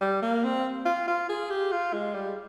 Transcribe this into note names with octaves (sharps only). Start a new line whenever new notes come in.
G3
A#3
C4
F4
F4
G#4
G4
F4
G#3
G3